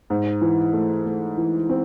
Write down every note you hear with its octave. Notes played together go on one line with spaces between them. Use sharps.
G#2
E3
A3
A3
E3
C4